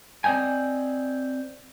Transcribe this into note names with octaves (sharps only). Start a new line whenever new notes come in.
C4 D5 D#5 G5 G#5